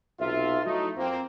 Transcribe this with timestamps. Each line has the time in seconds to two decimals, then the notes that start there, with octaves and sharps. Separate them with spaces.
0.20 B1 C3 F4 E5
0.66 F#3 A3 D#4 E4
0.96 F2 A#3 C4